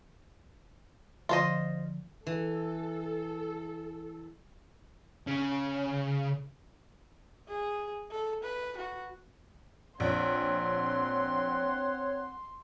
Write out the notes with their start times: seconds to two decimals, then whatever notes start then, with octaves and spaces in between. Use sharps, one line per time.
1.29 D3 F3 F4 C5 D#5
2.27 E3 A4
5.27 C#3
7.48 G#4
8.11 A4
8.43 B4
8.77 F#4
10.00 A#1 C4 C#5 F#5 C6